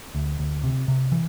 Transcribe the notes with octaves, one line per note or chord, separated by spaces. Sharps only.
D2
D2
C3
C3
E3